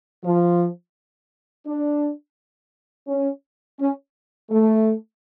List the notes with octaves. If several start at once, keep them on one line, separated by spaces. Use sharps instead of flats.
F3
D4
C#4
C#4
A3